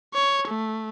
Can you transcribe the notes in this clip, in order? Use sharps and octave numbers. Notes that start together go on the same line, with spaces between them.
C#5
A3